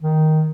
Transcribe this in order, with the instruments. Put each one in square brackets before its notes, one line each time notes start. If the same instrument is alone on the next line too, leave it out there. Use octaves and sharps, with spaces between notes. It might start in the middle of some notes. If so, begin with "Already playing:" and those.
[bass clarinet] D#3